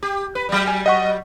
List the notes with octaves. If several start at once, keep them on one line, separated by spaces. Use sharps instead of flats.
G4
B4
F#3 G3
G#5
D#5 F#5 C#6